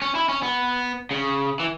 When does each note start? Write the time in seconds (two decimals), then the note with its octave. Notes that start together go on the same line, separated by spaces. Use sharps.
0.02 C#4
0.15 E4
0.29 C#4
0.43 B3
1.11 C#3
1.60 E3